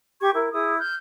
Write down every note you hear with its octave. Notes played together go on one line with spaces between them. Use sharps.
G4 C#6 G#6
E4 A#4
E4 G#4 D#6
F6 G6